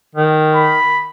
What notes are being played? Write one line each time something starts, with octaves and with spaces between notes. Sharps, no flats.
D#3
B5